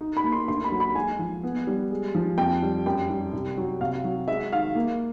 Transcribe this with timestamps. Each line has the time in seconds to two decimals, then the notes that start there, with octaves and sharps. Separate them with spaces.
0.01 D#4
0.17 B5
0.24 A#3
0.32 C6
0.48 D2 C6
0.64 B5
0.72 F#3
0.80 B5
0.95 G#3 G#5
1.19 F3
1.43 B3
1.67 G3
1.90 G#3
2.15 F3
2.38 F2 G5
2.62 G3
2.86 F#2 G5
3.10 G3
3.33 C2
3.57 F#3
3.81 C3 F5
4.04 F#3
4.28 G#3 E5
4.52 D#3 F5
4.75 A#3